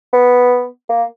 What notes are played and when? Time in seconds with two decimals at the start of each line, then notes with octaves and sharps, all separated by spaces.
0.13 B3
0.89 A#3